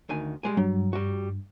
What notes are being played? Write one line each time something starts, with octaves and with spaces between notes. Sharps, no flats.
D2 D#3 G#5
G3 G#3 G#5
G2 F#3
G3 F#4